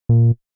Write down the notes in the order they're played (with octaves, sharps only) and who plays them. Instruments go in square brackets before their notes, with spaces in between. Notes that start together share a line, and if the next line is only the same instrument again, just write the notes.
[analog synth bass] A#2